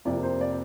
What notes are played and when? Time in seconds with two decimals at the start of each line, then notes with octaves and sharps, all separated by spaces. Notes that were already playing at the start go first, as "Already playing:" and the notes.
0.05 F2 C3 A#3 D5
0.23 C5
0.41 D5